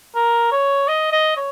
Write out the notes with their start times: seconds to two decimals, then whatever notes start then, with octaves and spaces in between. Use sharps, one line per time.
0.15 A#4
0.52 C#5
0.88 D#5
1.12 D#5
1.36 C#5